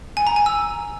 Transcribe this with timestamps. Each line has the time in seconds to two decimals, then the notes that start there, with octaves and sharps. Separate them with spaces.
0.17 G#5
0.27 A#5
0.36 G#5
0.46 E6